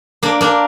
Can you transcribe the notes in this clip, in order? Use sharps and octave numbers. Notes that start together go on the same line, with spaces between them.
A#3 D4
A#3 D4